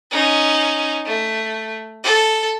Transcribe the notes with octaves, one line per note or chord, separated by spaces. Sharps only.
C#4 D#4
A3
A4